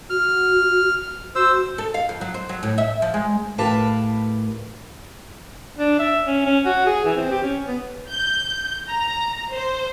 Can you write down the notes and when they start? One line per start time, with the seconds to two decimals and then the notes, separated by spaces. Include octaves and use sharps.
0.10 F#4 F6
1.36 F#4 C5 E6
1.78 A4
1.94 F5
2.09 F2
2.21 F#3
2.34 C5
2.49 F#3
2.63 A2
2.78 E5
3.02 F3
3.14 G#3
3.58 A2 G4 A#4 B4 F5 A5
5.79 D4
5.99 E5
6.27 C#4
6.46 C#4
6.65 F#4
6.86 G#4
7.05 E3
7.17 C4
7.32 G4
7.43 C#4
7.67 B3
8.10 G6
8.89 A#5
9.52 C5